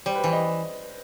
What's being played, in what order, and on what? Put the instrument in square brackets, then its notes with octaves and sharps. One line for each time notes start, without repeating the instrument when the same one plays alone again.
[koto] G3 [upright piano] C5
[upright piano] B4
[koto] E3 [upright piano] C5
[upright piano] D#5